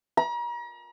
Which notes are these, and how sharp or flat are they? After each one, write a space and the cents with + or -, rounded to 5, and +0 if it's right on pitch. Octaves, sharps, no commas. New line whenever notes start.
A#5 +40